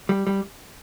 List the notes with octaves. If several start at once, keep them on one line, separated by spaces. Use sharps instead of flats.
G3
G3